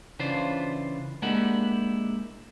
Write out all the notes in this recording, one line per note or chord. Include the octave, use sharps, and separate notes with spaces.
C#3 E3 D4 F4 C5
G#3 A#3 D4 E4 G4 F#5